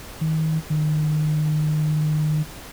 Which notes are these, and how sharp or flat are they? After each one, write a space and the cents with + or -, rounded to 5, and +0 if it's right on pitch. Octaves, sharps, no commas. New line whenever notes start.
D#3 +30
D#3 -30